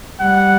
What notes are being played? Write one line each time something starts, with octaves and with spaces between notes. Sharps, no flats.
G3 F#5